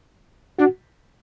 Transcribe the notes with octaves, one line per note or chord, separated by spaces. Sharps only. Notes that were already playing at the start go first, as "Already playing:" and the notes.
D4 F#4